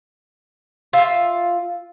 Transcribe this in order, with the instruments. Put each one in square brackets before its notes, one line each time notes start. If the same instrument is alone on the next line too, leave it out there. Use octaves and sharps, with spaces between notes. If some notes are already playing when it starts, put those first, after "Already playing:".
[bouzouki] F4 E5